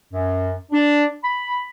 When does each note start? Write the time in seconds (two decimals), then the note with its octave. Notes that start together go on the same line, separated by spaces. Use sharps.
0.13 F#2
0.72 D4
1.23 B5